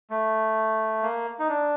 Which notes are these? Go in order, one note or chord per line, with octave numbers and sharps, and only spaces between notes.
A3
A#3
D#4
D4